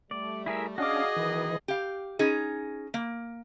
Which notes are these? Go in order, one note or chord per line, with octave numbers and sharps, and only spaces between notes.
G3 A3 D5
E4 G#4 A#4 E5
C#4 D4 F#4 G#4 D5 D#5 F5 D6
B1 D#3 E3
G4 F5
C#4 D#4 G#4
A#3